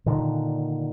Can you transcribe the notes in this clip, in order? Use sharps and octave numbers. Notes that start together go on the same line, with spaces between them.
A#2 D3 D#3